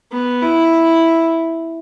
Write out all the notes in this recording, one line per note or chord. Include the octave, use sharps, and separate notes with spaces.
B3
E4